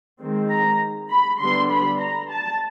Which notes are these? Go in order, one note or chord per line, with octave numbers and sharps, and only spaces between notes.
D#3 G#3 C4
A#5
B5
D3 G3 B3 D4 C6
B5
A#5
A5